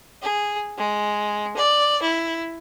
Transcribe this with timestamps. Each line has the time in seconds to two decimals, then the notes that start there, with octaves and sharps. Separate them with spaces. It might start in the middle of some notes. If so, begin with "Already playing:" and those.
0.21 G#4
0.78 G#3
1.56 D5
2.01 E4